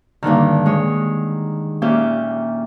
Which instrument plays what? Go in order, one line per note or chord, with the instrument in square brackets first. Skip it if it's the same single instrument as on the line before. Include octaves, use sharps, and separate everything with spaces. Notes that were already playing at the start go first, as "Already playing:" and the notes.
[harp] G2 A#2 D3 D#3
G#3 C#5
A#2 C#4 G4 E5 G6